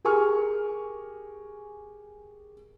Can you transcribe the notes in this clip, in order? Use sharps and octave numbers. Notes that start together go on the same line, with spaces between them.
G4 G#4 A#4 G#5 C#6 F6